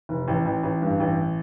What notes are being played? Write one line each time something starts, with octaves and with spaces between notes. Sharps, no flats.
F1
A1
A1
A1
G2
A1